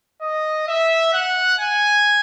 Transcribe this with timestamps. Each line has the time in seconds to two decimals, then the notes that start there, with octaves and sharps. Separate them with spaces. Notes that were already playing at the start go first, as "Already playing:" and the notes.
0.21 D#5
0.68 E5
1.13 F#5
1.60 G#5